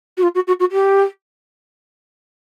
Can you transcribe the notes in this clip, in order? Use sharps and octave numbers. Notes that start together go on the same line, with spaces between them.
F#4
F4
F#4
F#4
F#4
G4